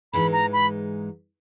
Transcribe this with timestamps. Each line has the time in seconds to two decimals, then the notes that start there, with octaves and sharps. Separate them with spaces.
0.13 G#2 E3 G#3 D#4 B5
0.32 A#5
0.53 B5